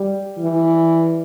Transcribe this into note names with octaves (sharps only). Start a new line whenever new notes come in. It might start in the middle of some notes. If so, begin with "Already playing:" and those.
Already playing: G3 G4
E3